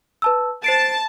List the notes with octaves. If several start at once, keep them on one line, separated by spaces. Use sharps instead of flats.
B4 A5 E6
C5 A5 C7 D7